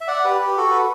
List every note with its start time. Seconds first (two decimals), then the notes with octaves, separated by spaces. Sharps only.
0.01 E5
0.08 D5 F#5
0.24 G4 B4
0.41 G4
0.57 F#4 A4
0.70 B4